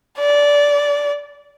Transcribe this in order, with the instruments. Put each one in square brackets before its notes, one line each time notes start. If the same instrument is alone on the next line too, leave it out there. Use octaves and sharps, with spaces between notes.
[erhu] D5